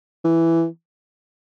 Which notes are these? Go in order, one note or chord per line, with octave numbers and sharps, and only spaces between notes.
E3